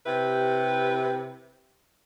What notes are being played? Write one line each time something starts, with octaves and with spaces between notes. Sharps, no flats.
C3 E4 G4 B4